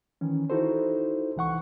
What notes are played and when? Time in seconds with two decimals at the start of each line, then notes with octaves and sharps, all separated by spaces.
0.21 D#3 E3 C#4
0.50 D#4 E4 F#4 A4 C5
1.36 C2 E3 F#5 C#6